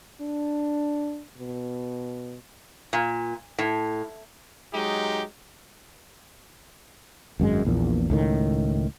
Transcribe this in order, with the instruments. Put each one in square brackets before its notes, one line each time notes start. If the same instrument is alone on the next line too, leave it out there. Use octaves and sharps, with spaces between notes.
[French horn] D4
B2
[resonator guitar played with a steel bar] A#2
A2
[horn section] F#3 G#3 D#4 G4
[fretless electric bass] G#1 F#2 A2 G#3
A#1 E2 A#2
C#2 A2 D#3